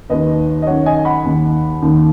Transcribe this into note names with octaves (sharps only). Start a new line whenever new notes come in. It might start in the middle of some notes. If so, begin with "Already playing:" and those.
D#2 D#3 B4 D#5
D#5
F#2 D#3 C#5 F#5
D#5 G#5
G#5
F#5 B5
D#2 D#3
D#2 D#3